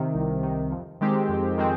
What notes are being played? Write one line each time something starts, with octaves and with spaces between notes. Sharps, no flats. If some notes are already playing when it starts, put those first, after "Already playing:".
Already playing: C3 D#3
C2
C3 D#3
F2
D#3 G#3 C4 G4
F2
D#3 G#3 C4